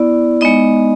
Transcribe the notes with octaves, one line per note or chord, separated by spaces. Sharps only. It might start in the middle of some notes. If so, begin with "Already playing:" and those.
Already playing: B3 E4 D5
G#3 B3 D#4 D#5